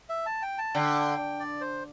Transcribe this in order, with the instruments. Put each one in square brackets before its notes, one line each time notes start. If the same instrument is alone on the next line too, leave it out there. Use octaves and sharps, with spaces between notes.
[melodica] E5
A5
G5
A5
[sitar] D3 [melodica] G5
[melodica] D5
C5